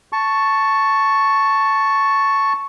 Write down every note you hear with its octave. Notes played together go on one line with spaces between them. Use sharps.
A5 C#6